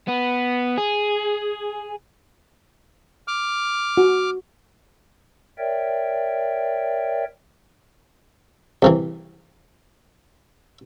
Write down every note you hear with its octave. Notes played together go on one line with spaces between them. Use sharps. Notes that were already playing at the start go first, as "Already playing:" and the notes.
B3
G#4
D6 F6
F#4
A#4 C#5 D5 E5 G5
C2 C3 E3